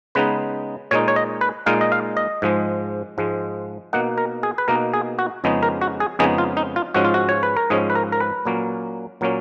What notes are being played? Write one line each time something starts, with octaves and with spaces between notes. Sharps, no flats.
C#3 G#3 B3 D#4 B4
A#2 G#3 D#4 C#5
C#5
D#5
B4
A#2 G#3 D#4 F5
D#5
F5
D#5
G#2 F3 G#3
G#2 F3 G#3
B2 A#3 D#4 F#5
A#4
G#4
B4
B2 A#3 D#4 A#4
G#4
F#4
F2 C#3 G#3 B3 D#4
A#4
F#4
G#4
F2 C#3 G#3 B3 D#4 G#4
F4
D#4
F4
G#2 F3 G#3 C#4 F#4
F4
F#4
C#5
B4
A#4
G#2 F3 G#3 C#4 G#4
B4
A#4
A#4
B4
A#2 F#3 A#3 C#4
A#2 F#3 A#3 C#4